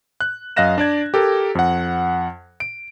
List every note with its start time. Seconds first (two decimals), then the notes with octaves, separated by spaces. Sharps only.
0.21 F#6
0.56 F#2 D#5 F5 F#6 A#6 E7
0.78 D4 D5 G#6
1.14 G4 A4 A#4
1.55 F2 F#5
2.60 D7